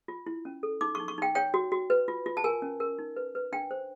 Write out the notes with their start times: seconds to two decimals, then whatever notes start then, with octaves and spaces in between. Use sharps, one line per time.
0.08 F4
0.26 E4
0.45 C#4
0.63 A4
0.81 D#4 D6
0.95 C#6
0.99 D#4
1.08 C#6
1.18 D#4 G5
1.35 C#5 G5
1.54 F#4
1.72 F#4
1.90 B4
2.08 F4
2.26 F4
2.37 A5
2.44 A#4 G#5
2.62 C#4
2.80 A#4
2.99 D#4
3.16 B4
3.35 B4
3.52 D4 G5
3.71 C5